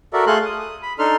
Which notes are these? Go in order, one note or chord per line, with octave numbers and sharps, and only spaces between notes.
F#4 A4 A#4 D5 E5
A3 G#4 A4 F5 C6 F#6
D#6
D#6
B5
D4 D#4 A4 C6 F6